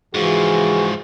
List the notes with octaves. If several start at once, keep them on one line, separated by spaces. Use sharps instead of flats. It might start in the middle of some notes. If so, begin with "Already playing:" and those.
G#2 E3 F3 F#4 G#4